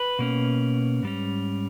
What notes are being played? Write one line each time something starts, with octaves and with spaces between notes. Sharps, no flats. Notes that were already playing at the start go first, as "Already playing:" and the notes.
Already playing: B4
B2 A#3 C#4
G#2 G3 C#4